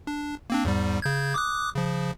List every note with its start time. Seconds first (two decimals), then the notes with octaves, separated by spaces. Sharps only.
0.07 D4
0.50 A#3 C4 D4
0.65 E2 G#2 G3
1.02 C#3 G6 G#6
1.34 D6 D#6 F#6
1.75 C#3 F3